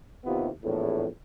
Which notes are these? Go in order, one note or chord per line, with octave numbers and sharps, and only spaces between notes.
D#2 C3 B3 E4 F4
A#1 E2 A2